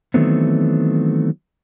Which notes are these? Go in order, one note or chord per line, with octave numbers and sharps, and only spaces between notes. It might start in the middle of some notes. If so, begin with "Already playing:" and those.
D#3 E3 F#3 A3 B3 C4